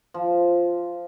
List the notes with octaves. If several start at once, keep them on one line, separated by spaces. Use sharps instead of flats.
F3